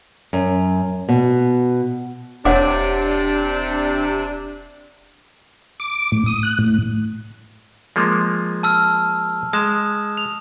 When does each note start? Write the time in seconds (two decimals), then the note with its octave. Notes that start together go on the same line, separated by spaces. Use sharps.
0.33 F#2
1.09 B2
2.45 E1 C3 D4 C#5 F#5 D6
5.80 D6
6.12 A2
6.26 D#6
6.43 F#6
6.59 A2
7.96 F3 G#3 A#3
8.63 A5 E6 F6
9.53 G#3 D#6 E7
10.17 F7